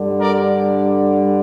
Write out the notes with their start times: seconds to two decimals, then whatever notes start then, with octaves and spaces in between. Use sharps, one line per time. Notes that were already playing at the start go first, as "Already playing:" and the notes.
Already playing: G2 D3 G3
0.21 A#4 D5